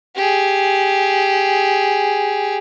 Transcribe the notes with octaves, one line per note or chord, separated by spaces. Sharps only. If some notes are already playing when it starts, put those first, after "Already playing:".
G4 G#4